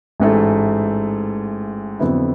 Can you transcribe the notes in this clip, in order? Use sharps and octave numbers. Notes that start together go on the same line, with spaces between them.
A1 G#2 E3 A3
F2 D3 F#3 B3 E4